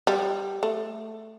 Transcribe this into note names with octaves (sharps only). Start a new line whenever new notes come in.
G3
A3